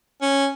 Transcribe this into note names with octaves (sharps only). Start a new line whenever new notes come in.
C#4